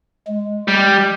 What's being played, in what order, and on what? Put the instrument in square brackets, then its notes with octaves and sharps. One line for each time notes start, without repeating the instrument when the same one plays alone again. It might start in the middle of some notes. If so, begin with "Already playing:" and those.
[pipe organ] G#3
[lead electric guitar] G3